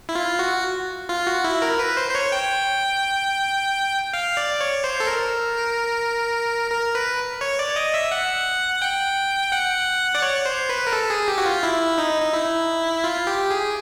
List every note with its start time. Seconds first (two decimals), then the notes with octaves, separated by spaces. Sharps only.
0.09 E4
0.15 F4
0.39 F#4
1.09 F4
1.27 F#4
1.44 E4
1.62 A#4
1.79 B4
1.97 C5
2.10 C5
2.15 C#5
2.32 G5
4.13 F5
4.37 D5
4.61 C#5
4.84 C5
5.00 A4
5.07 A#4
6.71 A#4
6.95 B4
7.41 C#5
7.59 D5
7.76 D#5
7.94 E5
8.11 F#5
8.82 G5
9.52 F#5
10.15 D5
10.22 C#5
10.45 C5
10.69 B4
10.87 A#4
10.93 A4
11.10 G#4
11.28 G4
11.38 F#4
11.46 F4
11.63 E4
11.98 D#4
12.22 D#4
12.33 E4
13.04 F4
13.27 G4
13.50 G#4